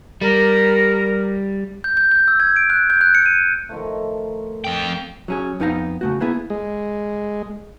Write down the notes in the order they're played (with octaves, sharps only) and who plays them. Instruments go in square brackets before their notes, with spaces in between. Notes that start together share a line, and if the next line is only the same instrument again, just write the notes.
[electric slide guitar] G3 [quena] A#4
[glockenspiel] G6
G6
G6
E6
G#6
D7
F#6
G6
F#6
C#7
D#7
[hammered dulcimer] D#3 F3 A3
[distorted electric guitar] F2 G5
[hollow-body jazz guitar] F#3 C#4 G#4
F2 B3 D#4 F5 A#5
C#3 A3 F#4
A#3 B3 E4 G#4
[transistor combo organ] G#3